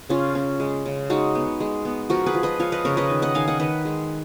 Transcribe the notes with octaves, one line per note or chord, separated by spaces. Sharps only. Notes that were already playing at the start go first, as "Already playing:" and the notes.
C#3 C#4 F4
C#4
G#3
C#3
G#3 D#4 F#4
B3
G#3
B3
F3 F#4 A#4
G#4 B4
F3
B4 D#5
F3 C#5 F5
B4 D#5
C#3 A#4 C#5
B4 D#5
D#3
D#5 F#5
D#3 F5 G#5
D#5 F#5
D#3 B4 D#5
G#3